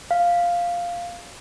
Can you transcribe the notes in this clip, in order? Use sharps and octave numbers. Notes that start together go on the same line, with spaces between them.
F5